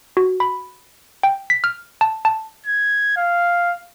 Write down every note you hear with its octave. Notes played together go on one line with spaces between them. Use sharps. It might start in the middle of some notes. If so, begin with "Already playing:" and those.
F#4
B5
G5
B6
F6
A5
A5
G#6
F5